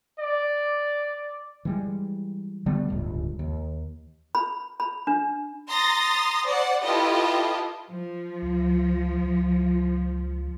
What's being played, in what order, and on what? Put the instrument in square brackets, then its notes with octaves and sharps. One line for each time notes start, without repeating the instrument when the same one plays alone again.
[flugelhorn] D5
[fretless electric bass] E3 G3 G#3
D3 G3 A3 B3
D1 G1 C#2
D#2
[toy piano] B5
B5
D4
[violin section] A#5 C6 D#6 A6 A#6
C5 D5 F#5
E4 F4 G4 A4 B4 D#5
[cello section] F3
[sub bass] C#2
C#2